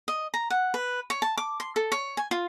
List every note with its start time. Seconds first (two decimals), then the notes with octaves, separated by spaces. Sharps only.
0.08 D#5
0.34 A#5
0.50 F#5
0.74 B4
1.10 C#5
1.22 A5
1.38 D6
1.60 C6
1.76 A4
1.92 C#5
2.17 G#5
2.31 F4